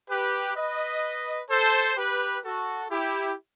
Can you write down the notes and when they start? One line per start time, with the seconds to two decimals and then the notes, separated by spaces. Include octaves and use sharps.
0.10 G4 B4
0.56 B4 D#5
1.50 A4 C5
1.97 G4 B4
2.44 F#4 A4
2.91 E4 G4